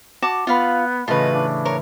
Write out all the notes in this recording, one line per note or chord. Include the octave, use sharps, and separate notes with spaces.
F#4 A5 D6
B3 F4 F5 F#5 B5
A2 C#3 E3 F4 B4 D#5
D4
A#4 C#5